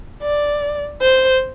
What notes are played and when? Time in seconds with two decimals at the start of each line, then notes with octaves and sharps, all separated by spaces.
0.23 D5
1.01 C5